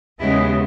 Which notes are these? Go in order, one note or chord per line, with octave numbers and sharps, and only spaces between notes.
D#2 C#3 G#3 B3 E4